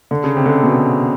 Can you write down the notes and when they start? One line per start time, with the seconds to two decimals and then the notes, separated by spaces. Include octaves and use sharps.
0.11 D3
0.24 C#3
0.37 C3
0.46 D3
0.50 C#3
0.63 B2